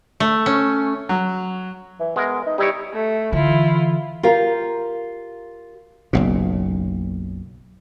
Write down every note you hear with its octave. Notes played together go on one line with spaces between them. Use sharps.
A3
C#4
F#3
E3
G#3 B3 A#4
D#4
G3 D#4 E4 C#5
A3
D3 E3 E4 F4
F4 G4 A#4 F5
F#1 B1 A#2